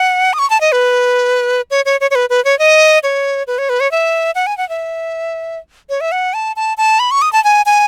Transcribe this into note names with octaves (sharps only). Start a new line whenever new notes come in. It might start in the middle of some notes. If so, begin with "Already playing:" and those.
Already playing: F#5
D#6
C#6
A5
D#5
B4
C#5
C#5
C#5
C#5
B4
B4
C#5
D#5
C#5
B4
C#5
B4
C#5
E5
F#5
G#5
F#5
E5
C#5
E5
F#5
A5
A5
A5
B5
C#6
D#6
A5
G#5
G#5